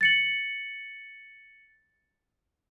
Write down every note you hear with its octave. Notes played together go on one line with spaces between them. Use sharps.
A6 C#7 F#7